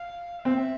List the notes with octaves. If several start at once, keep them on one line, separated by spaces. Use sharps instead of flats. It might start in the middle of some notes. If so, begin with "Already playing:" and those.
Already playing: F5
C4 E5